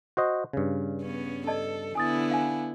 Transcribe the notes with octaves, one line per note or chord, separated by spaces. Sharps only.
F#4 C5 D#5
G2 C#3
B3 C#4
A4 D5 D#5 A5
D3 B3 E4 G#5 D#6 A6
F5 G#5